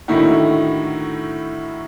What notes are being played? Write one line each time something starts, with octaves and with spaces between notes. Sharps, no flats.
A2 D3 D#3 D#4 E4 F#4